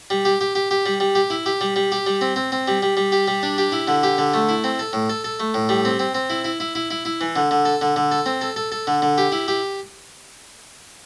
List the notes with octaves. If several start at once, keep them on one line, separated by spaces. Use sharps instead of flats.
G3
G4
G4
G4
G4
G3
G3
G4
E4
G4
G3
G3
G4
G3
C4
C4
C4
G3
G3
G3
G4
G3
D4
G4
E4
D3
G4
D3
A3
E4
C4
A4
A2
A4
A4
A3
A2
G3
C4
C4
C4
E4
E4
E4
E4
E4
E4
E3
D3
D3
A4
D3
D3
A4
C4
A4
A4
A4
D3
D3
G4
E4
G4